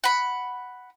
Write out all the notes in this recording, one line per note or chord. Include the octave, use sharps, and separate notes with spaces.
F#5 B5